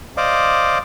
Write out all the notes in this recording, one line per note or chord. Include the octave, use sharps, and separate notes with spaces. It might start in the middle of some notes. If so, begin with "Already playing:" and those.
C5 D5 D#5 F5 D6